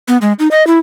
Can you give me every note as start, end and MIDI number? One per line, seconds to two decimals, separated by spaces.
0.08 0.17 59
0.22 0.33 56
0.39 0.48 63
0.51 0.66 75
0.67 0.79 64